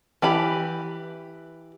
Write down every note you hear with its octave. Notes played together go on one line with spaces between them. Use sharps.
E3 G4 B5